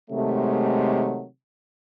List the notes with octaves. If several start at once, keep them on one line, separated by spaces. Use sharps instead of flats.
C3 D#3 F#3 G#3 A3